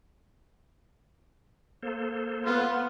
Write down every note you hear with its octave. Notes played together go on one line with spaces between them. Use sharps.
A#3 A4 C5
B3 F4